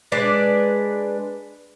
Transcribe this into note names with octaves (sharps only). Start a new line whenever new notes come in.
G#3 D4 B4 D5